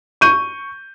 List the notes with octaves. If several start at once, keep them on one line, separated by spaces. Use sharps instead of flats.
C#6 G6 D#7